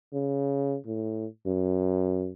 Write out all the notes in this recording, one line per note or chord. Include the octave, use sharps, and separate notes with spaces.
C#3
A2
F#2